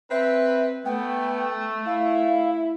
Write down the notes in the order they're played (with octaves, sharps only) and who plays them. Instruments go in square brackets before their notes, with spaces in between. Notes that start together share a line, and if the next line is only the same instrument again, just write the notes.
[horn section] C4 B4 [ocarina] E5
[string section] A3 [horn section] B3 [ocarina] G5
[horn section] E4 [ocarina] F5